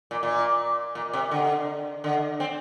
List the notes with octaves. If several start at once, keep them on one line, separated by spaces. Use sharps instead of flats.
A#2
A#2
A#2
C3
D3
D3
C4